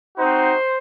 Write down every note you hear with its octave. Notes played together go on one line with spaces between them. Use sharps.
C4 D#4 F#4 C5